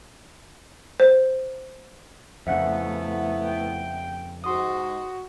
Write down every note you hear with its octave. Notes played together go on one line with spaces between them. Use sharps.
C5
F2 C#3 A3 B3 E4 E5 F#5 F#6
G5
G#2 F#4 C6 D#6